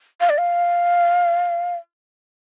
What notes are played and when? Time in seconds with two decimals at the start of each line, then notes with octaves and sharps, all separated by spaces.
0.20 F5
0.29 D5
0.38 F5